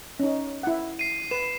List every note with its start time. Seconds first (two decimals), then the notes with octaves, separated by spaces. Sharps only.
0.20 C#4 D#4
0.63 E4 F#5
0.99 C7 D#7
1.31 B4 E7